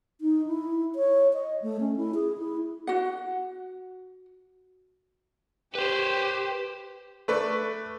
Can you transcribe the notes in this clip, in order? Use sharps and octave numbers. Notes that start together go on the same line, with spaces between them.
D#4
E4
C#5
D#5
A3
C#4
E4
G#4
E4
F#4 F#5
G4 B4 C5
A3 B4 D5 C#6